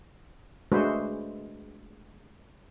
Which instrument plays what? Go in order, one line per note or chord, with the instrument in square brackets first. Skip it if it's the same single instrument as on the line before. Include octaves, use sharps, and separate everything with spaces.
[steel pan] G#3 A3 D4 F#4 B4 C5